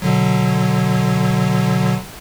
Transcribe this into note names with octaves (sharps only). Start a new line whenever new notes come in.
B2 D3 F#3